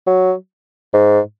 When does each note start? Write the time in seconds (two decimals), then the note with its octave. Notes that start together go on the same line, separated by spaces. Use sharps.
0.07 F#3
0.94 G#2